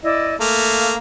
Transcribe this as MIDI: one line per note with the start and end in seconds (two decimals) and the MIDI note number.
0.03 0.35 64
0.03 0.35 74
0.03 0.35 75
0.40 0.95 57
0.40 0.95 58
0.40 0.97 77